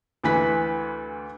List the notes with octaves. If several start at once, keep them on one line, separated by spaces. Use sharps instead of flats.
D2 E3 B4 B6